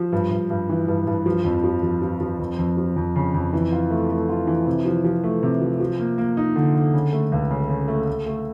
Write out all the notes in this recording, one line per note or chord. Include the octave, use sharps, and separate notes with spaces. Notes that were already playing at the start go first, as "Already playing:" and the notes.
Already playing: F3
G2
G2
G2
E3
G2
G2
F3
F2
F3
F3
F3
F3
F2
F2
F3
F2
C#3
F2
E3
F4
A3
A3
F4
E3
C3
F3
F3
A3
C3
F3
F3
A#3
A#3
D#4
D3
D3
C#3
A3
C#2
C#3
C#3
A3
A3
A3